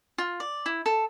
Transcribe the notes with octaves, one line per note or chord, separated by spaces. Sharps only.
F4
D5
E4
A4